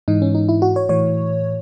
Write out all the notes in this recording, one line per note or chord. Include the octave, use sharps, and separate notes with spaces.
G#2 E3 D#4
C#4
D#4
E4
F#4
C#5
A2 E3 C#5